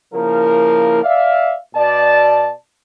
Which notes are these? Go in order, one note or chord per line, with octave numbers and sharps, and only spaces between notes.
C#3 F3 A#3 E4 A#4
D5 E5 F5
B2 D5 A5